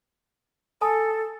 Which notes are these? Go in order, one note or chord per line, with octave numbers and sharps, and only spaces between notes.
A4 G#5 A5 D#6